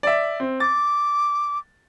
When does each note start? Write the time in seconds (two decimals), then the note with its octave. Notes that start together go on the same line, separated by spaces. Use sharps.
0.03 D5 E5
0.40 C4
0.60 D6 A6